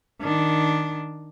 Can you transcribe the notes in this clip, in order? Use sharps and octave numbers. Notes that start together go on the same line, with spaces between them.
D#3 D4